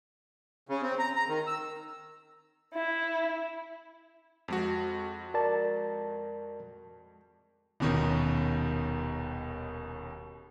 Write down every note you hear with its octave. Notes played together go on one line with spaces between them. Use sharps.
C#3
C4
A#5
A#5
D#3
E6
E4
F2 G#3 F#4
A#4 D5 A5
D#1 D#2 B2 D#3 C#4